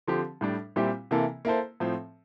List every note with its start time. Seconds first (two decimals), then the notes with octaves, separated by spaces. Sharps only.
0.07 D3 F3 C4 G4
0.41 A2 G3 D4
0.76 A#2 G3 C4 E4 G4
1.11 C3 E3 A#3 E4 A4
1.45 A#3 E4 A4 C5
1.80 A2 F3 C4